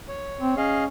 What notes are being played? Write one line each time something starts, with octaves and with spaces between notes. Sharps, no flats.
C#5
C4
C#4 G#4 D#5 F5